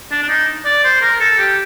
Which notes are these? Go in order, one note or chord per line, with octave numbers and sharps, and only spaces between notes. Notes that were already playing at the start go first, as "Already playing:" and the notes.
D4
D4
D#4
D5
C5
A#4
A4
G4